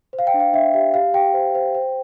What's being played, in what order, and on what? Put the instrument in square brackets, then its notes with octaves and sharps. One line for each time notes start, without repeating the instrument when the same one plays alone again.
[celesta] C5
F5
G5
D4
F5
D4 E5
G4 E5
G4 F5
G4 G5
C5
C5
C5